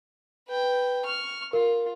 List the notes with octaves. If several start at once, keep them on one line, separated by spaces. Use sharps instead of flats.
B4 G5
C#6 F6
F4 A#4